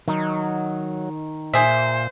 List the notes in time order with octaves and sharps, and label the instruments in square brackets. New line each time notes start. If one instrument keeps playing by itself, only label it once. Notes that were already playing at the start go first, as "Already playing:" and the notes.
[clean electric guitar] D#3 D#4 [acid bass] F#3
[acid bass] A#2 [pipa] G#4 E5 [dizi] C5